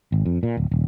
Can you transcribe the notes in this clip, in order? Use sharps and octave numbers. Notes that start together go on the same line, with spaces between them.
G#1
F2
A#2
D1
D#1